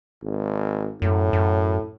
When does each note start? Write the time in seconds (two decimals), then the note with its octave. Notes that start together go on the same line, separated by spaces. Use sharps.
0.22 G#1
1.02 F#2 A2
1.33 F#2